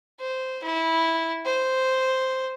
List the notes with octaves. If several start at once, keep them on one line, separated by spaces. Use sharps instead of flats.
C5
E4
C5